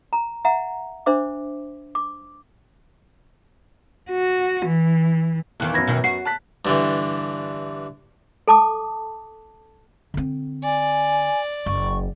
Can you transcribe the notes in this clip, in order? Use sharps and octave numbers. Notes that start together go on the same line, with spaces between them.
A#5
E5 F#5 A#5
D4 C5 E5 D6
D6
F#4
E3
B1 E2 D#3 E3 F#6
F#2 B3 B5 G#6 A#6
B2 D#3 E3
F#4 C7
A5 F#6 B6
G2 D3 E3
A4 A5 D6 D#6
D3 C4
D5 G#5
F#1 C#6